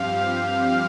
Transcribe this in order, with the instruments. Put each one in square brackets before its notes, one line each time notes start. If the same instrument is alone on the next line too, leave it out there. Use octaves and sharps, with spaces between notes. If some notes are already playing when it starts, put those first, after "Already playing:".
Already playing: [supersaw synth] G2 F3 C4 G4 [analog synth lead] F5